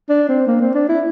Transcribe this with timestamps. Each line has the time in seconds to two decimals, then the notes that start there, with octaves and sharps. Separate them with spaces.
0.09 D4
0.29 C4
0.47 A#3
0.61 C4
0.75 D4
0.89 E4